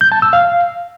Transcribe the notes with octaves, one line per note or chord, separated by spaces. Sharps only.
G6
A5
E6
F5